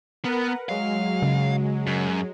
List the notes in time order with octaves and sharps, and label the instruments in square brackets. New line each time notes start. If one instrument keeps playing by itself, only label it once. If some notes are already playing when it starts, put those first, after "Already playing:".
[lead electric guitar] B3 [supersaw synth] A#4 B4 F#5
[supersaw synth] F#3 G#3 [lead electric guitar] F5
[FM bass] C#3
[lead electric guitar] F#2